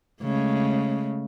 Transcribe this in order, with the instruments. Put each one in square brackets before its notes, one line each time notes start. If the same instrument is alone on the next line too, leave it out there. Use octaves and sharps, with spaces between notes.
[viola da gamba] C#3 G#3 A3